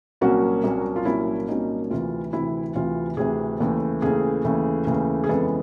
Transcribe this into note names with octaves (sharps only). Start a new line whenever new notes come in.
C2 A#2 F#3 A#3 C#4 F#4
C2 A#2 F#3 A#3 C#4
F4
C2 A#2 F#3 A#3 C#4 E4
C2 A#2 F#3 A#3 C#4 D#4
D2 C3 E3 F4
D2 C3 E3 E4
D2 C3 E3 F4
D2 C3 E3 G#4
D#2 C#3 E3 A3
D#2 C#3 E3 A3 G#4
D#2 C#3 E3 A3
D#2 C#3 E3 A3
G#4
F2 C#3 E3 G#3 B3 A4